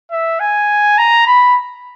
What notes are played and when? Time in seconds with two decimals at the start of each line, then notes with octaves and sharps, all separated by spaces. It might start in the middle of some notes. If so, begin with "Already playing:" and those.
0.11 E5
0.40 G#5
0.98 A#5
1.27 B5